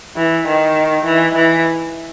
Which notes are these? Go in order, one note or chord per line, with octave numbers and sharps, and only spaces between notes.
E3
D#3
E3
E3